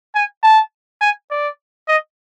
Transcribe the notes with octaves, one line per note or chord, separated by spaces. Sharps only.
G#5
A5
G#5
D5
D#5